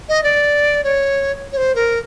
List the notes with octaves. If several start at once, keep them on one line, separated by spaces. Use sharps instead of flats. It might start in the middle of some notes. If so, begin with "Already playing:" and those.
D#5
D5
C#5
C#5
C5
A#4